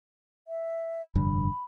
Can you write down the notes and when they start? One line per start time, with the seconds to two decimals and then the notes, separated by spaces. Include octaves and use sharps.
0.48 E5
1.15 F1 G2 D3 B5